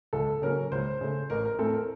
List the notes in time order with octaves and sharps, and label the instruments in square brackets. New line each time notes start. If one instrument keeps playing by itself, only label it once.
[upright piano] C#2 A4
C#3 F#3 A#3 C#4 A#4
C#2 C5
C#3 A3
A1 A#4
A#4
A2 A3 C4 A4
A#4